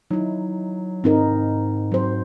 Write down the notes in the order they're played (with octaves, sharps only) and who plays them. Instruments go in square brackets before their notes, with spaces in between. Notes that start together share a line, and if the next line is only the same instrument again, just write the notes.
[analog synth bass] F#3 [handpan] D#4 E4
[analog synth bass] G#2 [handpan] C4 D#4 A#4
[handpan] F#3 C5